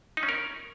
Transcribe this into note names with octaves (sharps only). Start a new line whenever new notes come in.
D#4
C#4
A#4